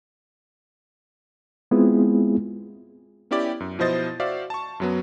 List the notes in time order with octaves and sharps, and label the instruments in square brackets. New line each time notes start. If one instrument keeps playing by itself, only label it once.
[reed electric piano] G#3 B3 C4 E4 F4 G#4
[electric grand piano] B3 C#4 E4 G4 D5
F#2
B2 F3 E4 C5 D#5 A6
F#4 C5 D5 E5 F5
A5 C#6
F#2 F#3 B3